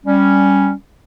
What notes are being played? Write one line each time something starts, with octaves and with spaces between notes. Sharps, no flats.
G3 C#4